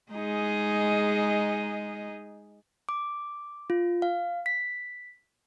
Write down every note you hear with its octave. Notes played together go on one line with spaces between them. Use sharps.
G#3 D#4 G#4
D6
F4
F5
B6